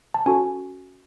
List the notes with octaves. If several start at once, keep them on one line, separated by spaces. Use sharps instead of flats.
A5
C#4 F#4 A4 G#5